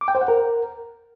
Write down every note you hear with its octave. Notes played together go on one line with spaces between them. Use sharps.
D6
G5
C5
F#5
A#4